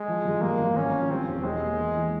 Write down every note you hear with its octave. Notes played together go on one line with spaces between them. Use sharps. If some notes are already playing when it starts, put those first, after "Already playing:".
Already playing: G#3
F3
G2
G2 A#3
G#1
G#1 C#4
F3
G3 C4
E1
G3 G#3
A#3
E3
E3